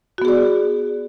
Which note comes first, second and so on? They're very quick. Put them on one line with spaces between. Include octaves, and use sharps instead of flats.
F#4 B3 G#4 D5